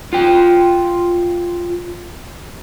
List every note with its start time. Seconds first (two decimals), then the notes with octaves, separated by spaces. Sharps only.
0.13 F4 G5